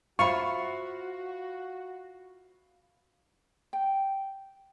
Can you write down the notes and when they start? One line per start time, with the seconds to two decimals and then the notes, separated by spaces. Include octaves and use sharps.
0.19 F4 F#4 C5 E5 F5 B5 C#6
3.73 G5